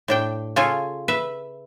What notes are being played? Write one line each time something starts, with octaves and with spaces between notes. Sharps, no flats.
A2 D4 G5
C#3 F4 A4 G#5
B4 E5